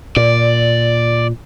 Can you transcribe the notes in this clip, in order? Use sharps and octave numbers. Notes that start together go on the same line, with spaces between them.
A#2 D5